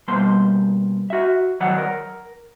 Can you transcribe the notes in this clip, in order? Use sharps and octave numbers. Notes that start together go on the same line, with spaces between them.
B2 G3 A#3 C5 C6
F#4 E5
D#3 F#3 C#5 D5 F#5
A#4